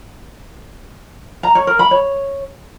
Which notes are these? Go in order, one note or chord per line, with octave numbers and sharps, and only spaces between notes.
A#5
C#5
A#4
B5
C#5